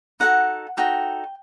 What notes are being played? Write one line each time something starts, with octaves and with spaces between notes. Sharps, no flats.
D#4 F#4 A4 F#5
D#4 F#4 A4 G5